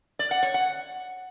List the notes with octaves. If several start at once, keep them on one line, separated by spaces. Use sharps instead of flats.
D5
F#5
C#5
F#5